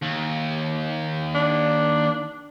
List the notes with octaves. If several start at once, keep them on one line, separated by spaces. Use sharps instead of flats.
D#2
D4